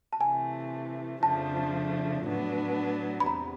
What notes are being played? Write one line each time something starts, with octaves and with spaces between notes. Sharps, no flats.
A5
C3 E3 A3 G#5
F2 C#3 F3 A3 D4 A5
A2 F#3 B3 D4
B5
E2 C3 A#5